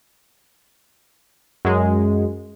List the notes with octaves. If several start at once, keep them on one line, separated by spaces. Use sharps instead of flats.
F#2 G#3